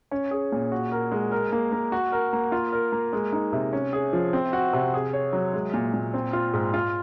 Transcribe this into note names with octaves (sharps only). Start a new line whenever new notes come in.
C#4
G#4
A#2
F#4
A#4
G#3
A#4
A#3
A#3
F#4
A#4
A#3
F4
A#4
A#3
G#3
D#4
C3
C#4
G#4
F3
C4
F#4
C3
G#4
C#5
F#3
G#3
A#2
A#2
C4
F4
G#2
F4